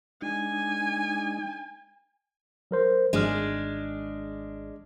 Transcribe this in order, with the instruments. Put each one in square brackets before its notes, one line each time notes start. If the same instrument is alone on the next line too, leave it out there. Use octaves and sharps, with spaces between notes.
[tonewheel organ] G#3 D4 D#4 [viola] G#5
[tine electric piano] F#3 A#4 C5
[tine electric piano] G#1 F6 [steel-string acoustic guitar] G#3 D4